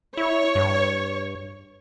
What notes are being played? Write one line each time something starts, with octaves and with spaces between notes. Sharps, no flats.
E4 C#5
G2